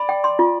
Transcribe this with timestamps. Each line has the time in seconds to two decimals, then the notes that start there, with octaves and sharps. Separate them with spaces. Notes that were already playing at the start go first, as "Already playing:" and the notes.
Already playing: D5 B5
0.09 G5
0.24 C6
0.39 F4